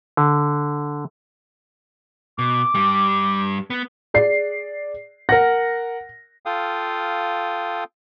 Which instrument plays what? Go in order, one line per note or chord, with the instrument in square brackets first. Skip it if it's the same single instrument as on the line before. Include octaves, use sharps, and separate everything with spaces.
[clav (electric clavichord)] D3
[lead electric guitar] B2 [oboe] D6
[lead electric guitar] G2 G3
B3
[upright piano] G#4 D5 C7
[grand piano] A#4 F#5 [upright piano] A#6
[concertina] F4 A4 F5 G5 D#6